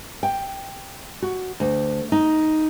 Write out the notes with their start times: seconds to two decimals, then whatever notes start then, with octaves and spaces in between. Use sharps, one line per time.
0.23 G5
1.22 F#4
1.60 D2
2.12 D#4